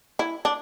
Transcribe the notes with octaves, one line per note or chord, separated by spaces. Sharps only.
E4
D4